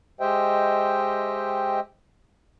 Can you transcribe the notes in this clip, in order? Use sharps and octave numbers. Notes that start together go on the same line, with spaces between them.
G#3 G4 C5 D#5 E5 G5